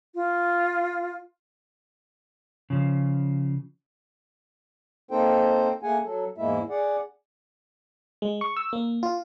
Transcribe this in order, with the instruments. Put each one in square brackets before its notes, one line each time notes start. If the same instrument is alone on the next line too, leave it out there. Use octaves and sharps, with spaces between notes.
[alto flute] F4
[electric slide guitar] C#3 F3
[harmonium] A#3 C4 D#4 A4 C5 G5
A3 A#3 G#4 F#5 G#5
F#3 A4
E2 G#2 G#3 A#3 E4 E5
G#4 D5 F#5
[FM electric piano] G#3
C#6
E6
A#3
F4